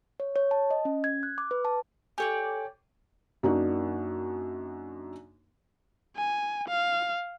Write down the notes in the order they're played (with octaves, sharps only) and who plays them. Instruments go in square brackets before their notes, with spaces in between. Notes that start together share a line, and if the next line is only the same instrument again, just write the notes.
[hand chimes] C#5
C#5
A5
D#5
C#4
G#6
F#6
D6
B4
A5
[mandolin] G4 C#5 D5 [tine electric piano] A4 G#5
[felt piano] F#2 A#3 D4 D#4 F#4
[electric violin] G#5
F5